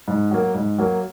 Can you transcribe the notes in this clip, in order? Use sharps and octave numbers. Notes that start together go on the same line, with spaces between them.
G#2
F#3 A#3
G#2
F#3 A#3